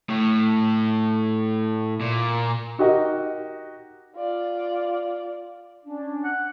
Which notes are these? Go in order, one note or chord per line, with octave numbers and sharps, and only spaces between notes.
A2
A#2
D#4 F#4 G4 A#4 D#5
F4 D5
C#4 D4
F#5